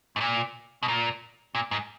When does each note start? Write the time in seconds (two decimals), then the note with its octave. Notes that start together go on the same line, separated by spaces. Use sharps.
0.16 G#2
0.21 A#2
0.83 B2
0.88 A#2
1.55 A#2
1.71 G#2